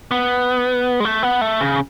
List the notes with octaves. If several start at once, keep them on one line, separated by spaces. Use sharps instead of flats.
B3
G#3
A3
B3
A3
C#3